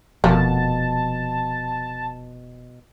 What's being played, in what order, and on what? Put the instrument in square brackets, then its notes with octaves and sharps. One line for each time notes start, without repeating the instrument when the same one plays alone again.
[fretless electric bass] F1 F2 [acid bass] B2 [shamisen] A#3 [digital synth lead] A5